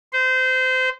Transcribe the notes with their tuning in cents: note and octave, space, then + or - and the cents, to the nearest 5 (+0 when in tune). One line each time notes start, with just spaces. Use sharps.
C5 -25